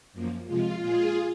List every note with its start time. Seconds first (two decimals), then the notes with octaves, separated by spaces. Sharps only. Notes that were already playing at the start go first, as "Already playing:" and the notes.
0.13 F#2 F3 A#3
0.46 C3 F3 G#3 F4
0.79 A#2 G#3 F4 G#4